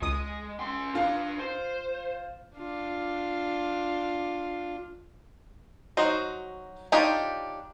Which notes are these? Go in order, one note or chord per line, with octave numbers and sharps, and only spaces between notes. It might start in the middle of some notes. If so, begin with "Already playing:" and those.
C#2 G#3 D#6
C#4 C6
D4 F4 B4
C5
D4 F4
F#3 D#4 F#4 C5
D4 D#4 F4 G4 C#5